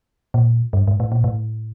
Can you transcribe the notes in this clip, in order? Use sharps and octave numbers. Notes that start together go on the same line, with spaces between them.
A#2
G2
G#2
A2
A#2
A2